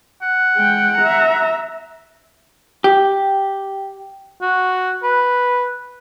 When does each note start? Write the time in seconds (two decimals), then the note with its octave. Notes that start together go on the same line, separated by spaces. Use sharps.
0.22 F#5
0.57 G#3 G5
0.98 E5 A#5
2.84 G4
4.42 F#4
5.03 B4